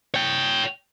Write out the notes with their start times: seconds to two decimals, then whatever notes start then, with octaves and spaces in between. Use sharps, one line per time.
0.14 C#5 G5